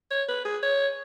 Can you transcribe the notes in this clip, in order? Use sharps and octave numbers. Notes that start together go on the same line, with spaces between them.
C#5
B4
G#4
C#5